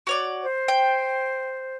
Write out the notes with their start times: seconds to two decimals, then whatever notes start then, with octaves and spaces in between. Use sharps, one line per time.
0.07 F#4 C#5 D5
0.43 C5
0.68 G5